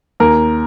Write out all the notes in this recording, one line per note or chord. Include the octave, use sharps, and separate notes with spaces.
D#2 A#4